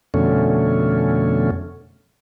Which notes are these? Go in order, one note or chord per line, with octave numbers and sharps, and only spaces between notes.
F2 B2 D3 A3 C#4